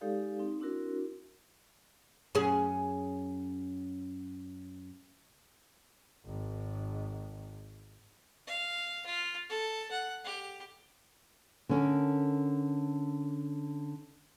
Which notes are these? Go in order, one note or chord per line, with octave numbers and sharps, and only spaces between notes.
G#3 D#4 G4 A4 D5 F5
C4 D#4
C4 D4 E4 F#4 A#4
F#2 C#4 G#4
G#1 G#2
F5
F4
A4
F#5
G4
D3 C#4 A#4